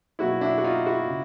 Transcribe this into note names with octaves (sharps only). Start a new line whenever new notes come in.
B2 F#3 A#3 D#4 E4 F#4
D4 E4
F#4
D#4 F4
E4 F#4
C#3